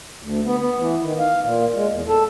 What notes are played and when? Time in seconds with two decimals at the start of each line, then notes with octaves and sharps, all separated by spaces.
0.23 D2
0.45 B3
0.60 B3
0.79 E3
1.02 D#3
1.19 F5
1.43 A#2
1.76 G#3
1.90 E2
2.08 A4